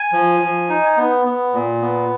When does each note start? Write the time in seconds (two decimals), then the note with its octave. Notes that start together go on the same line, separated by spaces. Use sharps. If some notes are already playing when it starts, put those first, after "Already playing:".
Already playing: G#5
0.13 F3
0.40 F3
0.69 D#4
0.97 B3
1.25 B3
1.53 A#2
1.82 B3